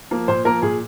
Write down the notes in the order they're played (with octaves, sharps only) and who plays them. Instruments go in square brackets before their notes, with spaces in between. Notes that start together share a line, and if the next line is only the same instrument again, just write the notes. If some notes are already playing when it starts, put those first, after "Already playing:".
[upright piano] F3 A#3
A#2 C5
F3 A#3 A#4
A#2 G#4